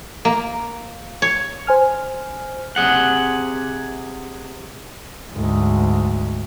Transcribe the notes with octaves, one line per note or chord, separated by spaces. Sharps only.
A#3
C#5
C5 G#5 F6
C3 G#4 F#5
D2 G#2